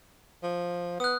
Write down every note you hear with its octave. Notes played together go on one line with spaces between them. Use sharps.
F3
B3 D#6 F#6